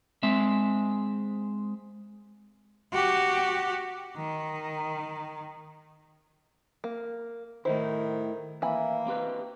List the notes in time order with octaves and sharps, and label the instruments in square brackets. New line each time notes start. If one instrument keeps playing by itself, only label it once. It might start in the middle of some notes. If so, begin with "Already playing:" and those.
[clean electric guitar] G#3 C4 E5
[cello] F#4 G4
D#3
[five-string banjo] A#3
[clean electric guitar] A2 D#4 E4 [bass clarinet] D#3 [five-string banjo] C5
[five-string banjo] E3 G#5 B5 [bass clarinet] A#3 [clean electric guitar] E5
[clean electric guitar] C4 G4 B4